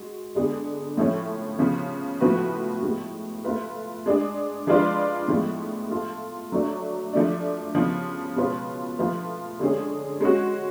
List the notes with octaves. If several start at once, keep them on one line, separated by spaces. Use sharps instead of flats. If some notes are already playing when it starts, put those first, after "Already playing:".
Already playing: G#3 F#4
D3 G#3 B3 D4 G#4
A2 F3 A3 C#4
C#3 F3 B3
A2 F3 B3 F#4 B4
A2 G#3 B3
A3 F4 B4
G#3 D4 G#4
F3 G#3 D4 F4 B4
A2 F3 G#3 B3
A3 F4 A4
F#3 A3 D4
F3 A3 D4
C#3 F3 B3
B2 G#3 C#4 F4 B4
F3 A3 F4 B4
D3 G#3 C#4 G#4
G#3 C#4 F#4